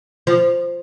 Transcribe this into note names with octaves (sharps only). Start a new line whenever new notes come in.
F3